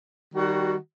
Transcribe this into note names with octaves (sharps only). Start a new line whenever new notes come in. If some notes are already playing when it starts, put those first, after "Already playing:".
D#3 G3 F#4